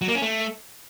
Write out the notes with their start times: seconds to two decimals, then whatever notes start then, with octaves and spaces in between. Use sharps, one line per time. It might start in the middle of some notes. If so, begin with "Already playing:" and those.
0.01 F#3
0.08 A#3
0.15 C#4
0.22 A3